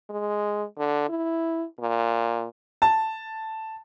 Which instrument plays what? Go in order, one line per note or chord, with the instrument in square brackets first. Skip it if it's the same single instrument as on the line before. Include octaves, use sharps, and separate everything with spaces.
[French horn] G#3
D3
E4
A#2
[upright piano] A5